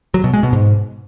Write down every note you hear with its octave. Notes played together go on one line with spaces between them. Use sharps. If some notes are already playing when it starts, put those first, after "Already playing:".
F#3
B2
G#3
B2
G#2